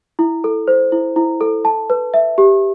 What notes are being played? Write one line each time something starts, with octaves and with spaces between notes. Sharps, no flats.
E4
A4
C5
E4
E4
A4
A5
B4
E5
G4